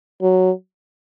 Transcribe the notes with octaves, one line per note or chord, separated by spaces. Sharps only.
F#3